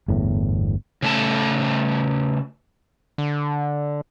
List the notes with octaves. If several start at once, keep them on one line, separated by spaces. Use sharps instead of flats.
G1 E2 A2
C#3 A3 A5
D3